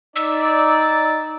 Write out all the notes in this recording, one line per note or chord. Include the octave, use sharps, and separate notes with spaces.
D#4 D5 E6